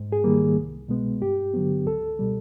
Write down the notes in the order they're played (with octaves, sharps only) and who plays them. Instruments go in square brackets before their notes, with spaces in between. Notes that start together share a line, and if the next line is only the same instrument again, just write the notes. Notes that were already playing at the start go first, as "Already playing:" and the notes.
Already playing: [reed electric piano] G#2
G#4
D#3 G3 A#3
C2
B2 G#3 B3
G2 G4
D3 F#3 B3
C#2 A4
B2 G3